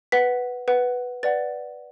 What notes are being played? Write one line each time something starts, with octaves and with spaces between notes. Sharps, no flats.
B4 F#5 B6
B4 F#5
B4 D5 F#5 A6